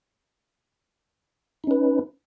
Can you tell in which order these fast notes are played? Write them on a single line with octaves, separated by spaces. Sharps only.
D#4 C#4 B4